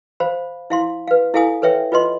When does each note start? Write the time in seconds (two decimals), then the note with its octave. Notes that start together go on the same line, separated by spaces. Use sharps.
0.20 C5 F5 B5
0.70 E4 F5 C6
1.08 B4 F5
1.34 E4 A4 F5 G#5 D#6
1.62 A4 B4 C#5 E5 G5
1.92 F4 B4 D#5 C6